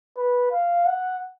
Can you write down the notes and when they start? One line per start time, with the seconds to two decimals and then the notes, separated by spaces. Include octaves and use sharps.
0.17 B4
0.52 F5
0.86 F#5